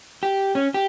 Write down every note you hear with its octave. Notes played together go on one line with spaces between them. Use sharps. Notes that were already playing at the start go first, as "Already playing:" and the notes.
G4
C#4
G4